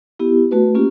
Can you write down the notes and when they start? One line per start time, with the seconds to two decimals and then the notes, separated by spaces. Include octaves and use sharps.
0.20 B3 E4 G4
0.51 A3 F#4 B4
0.75 A#3 C#4 F4 G4